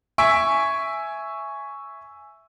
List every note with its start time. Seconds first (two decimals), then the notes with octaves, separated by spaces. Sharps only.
0.18 E5 G#5 C#6 E6 B6 D7